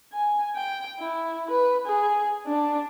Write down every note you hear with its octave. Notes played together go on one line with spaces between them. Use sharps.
G#5
G5
E4
B4
G#4
D4